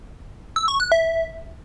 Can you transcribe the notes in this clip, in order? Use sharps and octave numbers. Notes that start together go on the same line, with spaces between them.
E6
C#6
F#6
E5